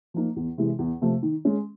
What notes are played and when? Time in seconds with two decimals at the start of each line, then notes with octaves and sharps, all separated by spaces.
0.14 F3 A#3 D#4
0.36 E2
0.58 C3 E3 G#3
0.79 E2
1.01 C3 F3 A3
1.23 D#3
1.45 G#3 C#4